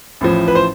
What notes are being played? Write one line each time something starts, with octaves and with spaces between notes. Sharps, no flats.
A1 A2 F3
B4
C5